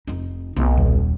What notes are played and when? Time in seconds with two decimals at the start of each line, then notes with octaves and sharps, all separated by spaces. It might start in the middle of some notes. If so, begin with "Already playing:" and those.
0.08 F1 D#4
0.56 B1 A#3
0.77 D#1